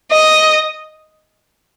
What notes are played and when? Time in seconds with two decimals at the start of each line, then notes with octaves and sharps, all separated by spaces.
0.12 D#5